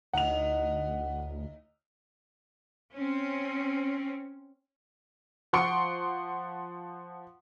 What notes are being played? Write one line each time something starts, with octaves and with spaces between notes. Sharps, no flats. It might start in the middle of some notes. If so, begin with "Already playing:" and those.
D2 A2 D#4 F#5 F7
C4 C#4
F3 F#5 C6 C#6 C#7 D7